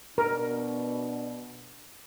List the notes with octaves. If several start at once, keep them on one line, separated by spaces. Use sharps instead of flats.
B2 D4 A#4